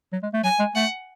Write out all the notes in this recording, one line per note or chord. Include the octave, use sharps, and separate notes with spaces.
F#3
G#3
A3
F#3 G#5
G#3
A3 F#5